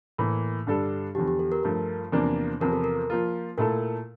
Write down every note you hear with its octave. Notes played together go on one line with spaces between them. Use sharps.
A2 E3 A#3
G2 D3 G3 D4 A4
E2 D3 F3 G4
G4
A4
A#4
G2 F3 A3 A#4
E2 C3 F3 A#3 D4
E2 C3 F3 A#4
A4
A#4
F3 A#3 F4
A#2 A3 E4 A4 A#4